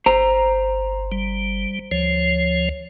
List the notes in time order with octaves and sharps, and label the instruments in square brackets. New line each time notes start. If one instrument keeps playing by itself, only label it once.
[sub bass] G1 [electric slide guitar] C5 A#5
[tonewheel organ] G3
[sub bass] D2 [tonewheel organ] F3 C#5